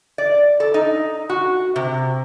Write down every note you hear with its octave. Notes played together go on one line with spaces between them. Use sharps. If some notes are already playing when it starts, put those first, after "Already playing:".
D5
A4
D#4
F#4
C3